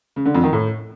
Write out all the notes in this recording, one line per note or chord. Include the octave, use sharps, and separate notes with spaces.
C#3
D3
F2
D#3
A2